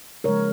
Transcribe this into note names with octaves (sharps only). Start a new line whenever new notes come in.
C#3 F3 G#3 A#4 C#5